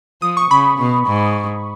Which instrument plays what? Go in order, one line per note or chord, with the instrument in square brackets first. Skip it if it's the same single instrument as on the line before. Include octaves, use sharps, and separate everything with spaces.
[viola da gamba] F3 [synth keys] D#6
[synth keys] C#6
[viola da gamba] C#3 [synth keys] B5
[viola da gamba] B2
G#2